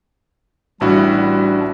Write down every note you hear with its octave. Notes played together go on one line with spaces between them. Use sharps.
A1 G3 D4 E4 F#4